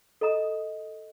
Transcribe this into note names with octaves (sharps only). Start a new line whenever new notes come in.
A4 D#5 A#5 D#6